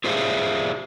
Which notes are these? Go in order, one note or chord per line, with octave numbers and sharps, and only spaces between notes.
F4 G4 G#4 C5 E5 F5